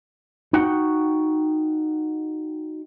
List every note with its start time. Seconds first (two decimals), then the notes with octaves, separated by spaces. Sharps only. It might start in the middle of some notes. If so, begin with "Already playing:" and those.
0.53 D#4 F#4 F#5 G5